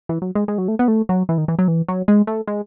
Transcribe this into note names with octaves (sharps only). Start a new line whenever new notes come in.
E3
F#3
G#3
G#3
F#3
A3
B3
A3
F#3
E3
D#3
E3
F#3
E3
F#3
G#3
A3
G#3